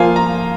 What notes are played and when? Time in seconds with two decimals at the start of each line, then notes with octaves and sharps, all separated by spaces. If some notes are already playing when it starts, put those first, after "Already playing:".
Already playing: F3 A#3 F4 G#5
0.16 A#5